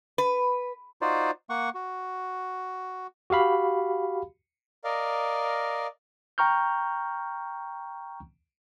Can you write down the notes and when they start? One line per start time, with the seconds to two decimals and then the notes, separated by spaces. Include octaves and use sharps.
0.18 B4
1.02 D#4 F4 F#4 C5 D5
1.50 A#3 F#5 C#6
1.74 F#4
3.30 F#4 G4 F5 B5
4.84 A#4 D5 D#5 F5
6.38 G5 A#5 C#6 F6 G6